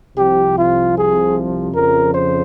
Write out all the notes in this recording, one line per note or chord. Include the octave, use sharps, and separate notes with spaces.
C2 C3 F3 G4
F4
G#4
F2 C#3 F3 A#4
C5